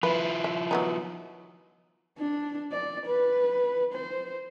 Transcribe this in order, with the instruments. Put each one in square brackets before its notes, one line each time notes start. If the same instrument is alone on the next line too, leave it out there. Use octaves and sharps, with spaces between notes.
[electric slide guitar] F3 E4 [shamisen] B4
[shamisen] E5
F#3 B3 D#4
[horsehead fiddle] D4
D5
B4
C5